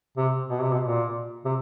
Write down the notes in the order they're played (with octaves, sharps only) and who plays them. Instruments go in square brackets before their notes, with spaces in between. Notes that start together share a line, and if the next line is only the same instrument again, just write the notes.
[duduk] C3
B2
C3
B2
A#2
C3